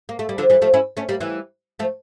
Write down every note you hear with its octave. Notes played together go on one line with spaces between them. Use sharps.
A#3
A3
G3
D3 F3
E3 G3
F3 A3
C#4 E4
A3 C#4
G3 A#3
E3 G3
F3 A3